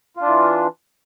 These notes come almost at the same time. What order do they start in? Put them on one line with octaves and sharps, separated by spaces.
F4 D4 E3